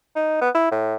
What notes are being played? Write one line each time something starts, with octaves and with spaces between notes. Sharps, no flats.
D#4
B3
E4
A2